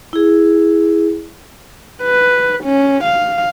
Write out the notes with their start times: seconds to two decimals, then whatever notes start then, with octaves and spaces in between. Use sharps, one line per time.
0.13 E4 G#4
2.03 B4
2.65 C#4
3.04 F5